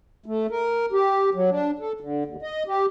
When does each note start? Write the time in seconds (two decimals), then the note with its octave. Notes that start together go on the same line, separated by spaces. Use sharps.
0.26 A3
0.50 A#4
0.92 G4
1.34 F#3
1.50 D4
1.79 A4
2.01 D3
2.25 D#2
2.42 D#5
2.67 G4